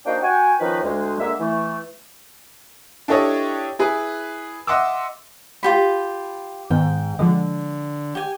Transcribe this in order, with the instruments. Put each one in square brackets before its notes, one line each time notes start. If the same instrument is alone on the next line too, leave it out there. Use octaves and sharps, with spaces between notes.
[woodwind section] A#3 D4 D#4 F#4 C5 G5
F#4 G5 G#5
D#3 F3 C#4 D#4 B4
D2 G#3
D3 G#3 A#3 E5
E3 A3
[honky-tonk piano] D4 E4 G4 A4 C#5 D#5
E4 G#4 B4
D#5 E5 F#5 C6 D6 E6
[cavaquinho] F4 G4 B5
[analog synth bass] G#2 [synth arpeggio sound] D#3 B3 [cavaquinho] G5
[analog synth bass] D3 [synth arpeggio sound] F3 G#3 D#5
[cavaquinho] G4 G#5